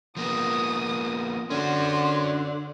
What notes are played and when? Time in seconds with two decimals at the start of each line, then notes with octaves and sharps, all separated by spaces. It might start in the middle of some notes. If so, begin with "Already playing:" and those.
0.17 F3 A#3 B3 D#6
1.50 D3 C#4 F#4 C6